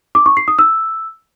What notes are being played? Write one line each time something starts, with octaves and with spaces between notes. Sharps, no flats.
D6
C#6
C7
D#6
E6